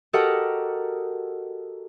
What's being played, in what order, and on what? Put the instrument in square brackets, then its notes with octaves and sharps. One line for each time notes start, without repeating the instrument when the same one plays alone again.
[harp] F#4 G4 A4 A#4 D#5 F#5